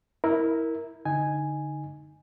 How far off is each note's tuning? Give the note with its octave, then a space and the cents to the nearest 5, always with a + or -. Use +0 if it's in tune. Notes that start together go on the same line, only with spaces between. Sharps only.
E4 -15 A#4 +0
D3 -15 D#4 +0 G#5 +0